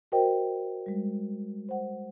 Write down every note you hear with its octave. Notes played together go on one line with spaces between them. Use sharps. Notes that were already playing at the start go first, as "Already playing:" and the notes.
F#4 A#4 C5 D#5 G5
G3 G#3
C5 F#5